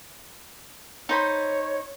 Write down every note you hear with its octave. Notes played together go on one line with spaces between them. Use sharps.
D#4 C5 C#5 B5